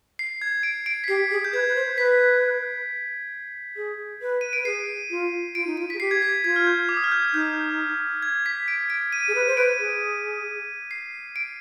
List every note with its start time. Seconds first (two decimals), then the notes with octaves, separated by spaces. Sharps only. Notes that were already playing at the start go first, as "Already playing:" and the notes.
0.19 C7
0.42 G#6
0.63 D7
0.86 D7
1.04 B6
1.08 G4 C7
1.31 G#4
1.45 G6
1.53 B4 G#6
1.67 B4
1.75 C5
1.97 B4 B6
3.77 G#4
4.22 B4
4.41 D#7
4.53 B4 D7
4.65 G#4 C7
5.10 F4
5.55 F4 D7
5.67 D#4
5.77 F4 D7
5.90 G#4 B6
6.00 G4 C7
6.11 G#6
6.22 B6
6.44 F4 G#6
6.56 F6
6.67 G6
6.89 D6
6.97 D#6
7.04 F6
7.12 G6
7.33 D#4 G6
8.22 G#6
8.46 B6
8.68 D7
8.90 D7
9.12 D#7
9.28 G#4
9.35 B4
9.47 C5
9.57 B4 D7
9.79 G#4
10.91 C7
11.36 D7